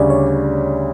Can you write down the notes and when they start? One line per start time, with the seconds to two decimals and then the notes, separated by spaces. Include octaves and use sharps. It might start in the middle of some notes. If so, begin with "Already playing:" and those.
Already playing: D2 C#3 G3 C#5 D5
0.10 C#5